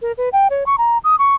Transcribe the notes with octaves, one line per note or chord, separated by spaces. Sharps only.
A#4
B4
G5
C#5
C#6
A#5
D#6
C#6